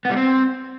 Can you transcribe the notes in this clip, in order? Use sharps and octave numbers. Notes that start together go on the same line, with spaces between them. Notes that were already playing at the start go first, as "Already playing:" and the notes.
B3
G3
C4